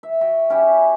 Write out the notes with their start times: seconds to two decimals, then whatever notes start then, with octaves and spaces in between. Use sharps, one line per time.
0.03 E5
0.21 F#4 E5 G5
0.50 C#4 E4 G4 G#5